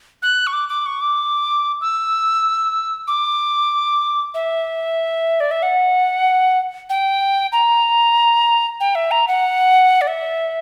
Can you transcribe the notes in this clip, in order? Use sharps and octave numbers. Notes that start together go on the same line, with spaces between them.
F#6
C#6
D6
D6
C#6
D6
E6
D6
E5
D5
E5
F#5
G5
A#5
G5
E5
A#5
F#5
D5
E5